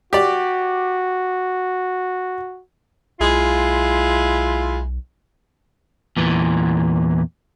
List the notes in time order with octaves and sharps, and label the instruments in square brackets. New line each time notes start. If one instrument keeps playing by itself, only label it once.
[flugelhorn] F#4 [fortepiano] G4 D5
[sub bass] B1 [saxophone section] G#3 E4 F4
[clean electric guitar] E2 A#2 E3